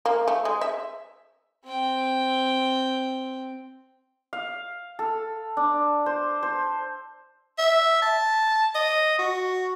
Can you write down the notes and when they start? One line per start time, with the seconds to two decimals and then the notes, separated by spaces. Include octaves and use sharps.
0.06 A#3
0.28 A3
0.45 G#3
0.61 E5
1.65 C4 G5
4.33 F5
4.99 A4
5.57 D4
6.06 C5
6.43 C5
7.58 E5
8.02 A5
8.75 D#5
9.19 F#4